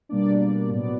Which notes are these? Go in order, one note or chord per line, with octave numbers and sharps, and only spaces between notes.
B2 G3 A#3 D4 D5
A2 F#3 B3 D5